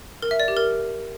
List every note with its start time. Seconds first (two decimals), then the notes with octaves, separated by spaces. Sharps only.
0.22 A#4
0.31 E5
0.40 D5
0.48 G4
0.57 A#4